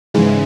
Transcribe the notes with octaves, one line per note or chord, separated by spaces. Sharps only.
G#2 C#3 E3 G#3